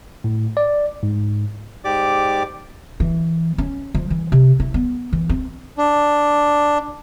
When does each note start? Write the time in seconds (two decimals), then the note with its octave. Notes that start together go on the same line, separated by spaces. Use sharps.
0.24 A2
0.57 D5
1.03 G#2
1.84 G#2 G4 D5 D6
3.00 E3
3.58 C#4
3.94 F3
4.10 E3
4.32 C3
4.60 E4
4.74 B3
5.13 E3
5.29 C4
5.78 D4